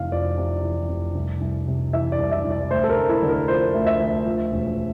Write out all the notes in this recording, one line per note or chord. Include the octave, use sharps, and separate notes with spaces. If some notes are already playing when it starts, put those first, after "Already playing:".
Already playing: F1 E3 F5
F2 D5
C3
E3
F1
C2
C2
C3
E3 E5
D5
C2
E5
C2
D5
D2 C5
A4
A#4
D2
E4
D3
A#4
F3 C5
D2
E5
D2
F3
E1